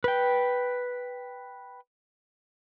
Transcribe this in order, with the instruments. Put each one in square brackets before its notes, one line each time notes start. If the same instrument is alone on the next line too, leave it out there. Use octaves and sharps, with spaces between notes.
[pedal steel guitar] B4 G5